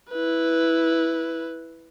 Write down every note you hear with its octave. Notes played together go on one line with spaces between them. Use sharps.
E4 B4